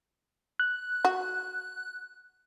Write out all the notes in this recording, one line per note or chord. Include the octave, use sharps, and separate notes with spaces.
F#6
F#4